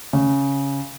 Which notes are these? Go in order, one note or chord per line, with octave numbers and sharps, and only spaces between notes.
C#3